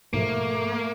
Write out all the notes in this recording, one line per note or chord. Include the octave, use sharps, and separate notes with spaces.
G#2 B2 F3 A3 A#3